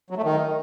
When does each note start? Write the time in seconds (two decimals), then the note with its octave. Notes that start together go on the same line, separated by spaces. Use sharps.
0.10 F#3
0.17 A3
0.24 D#3